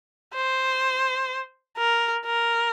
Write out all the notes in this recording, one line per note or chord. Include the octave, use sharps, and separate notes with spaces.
C5
A#4
A#4